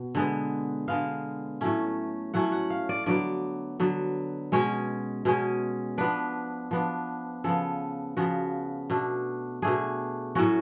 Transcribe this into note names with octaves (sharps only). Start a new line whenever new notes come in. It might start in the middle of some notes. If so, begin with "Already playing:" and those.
Already playing: B2
D3 G#3 B3
D3 G#3 B3 F5
A2 F#3 A3 C#4
A2 F#3 A3 C#4 F#5
F#5
F5
D5
D3 F#3 B3 D5
D3 F#3 B3
B2 G#3 C#4 C#5
B2 G#3 C#4
F3 B3 D4 B4
F3 B3 D4
C#3 F3 B3 A4
C#3 F3 B3 F#4
B2 A3 D4
B2 A3 D4 G#4
A2 F#3 C#4 F#4